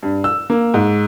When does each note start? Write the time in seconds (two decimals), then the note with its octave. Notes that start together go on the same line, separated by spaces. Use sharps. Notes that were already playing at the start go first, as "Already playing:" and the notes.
0.03 G2
0.24 E6
0.50 A#3
0.74 G#2